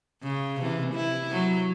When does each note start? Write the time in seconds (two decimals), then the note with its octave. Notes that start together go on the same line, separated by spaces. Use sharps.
0.23 C#3
0.61 C3 E3
0.94 E4
1.31 F#3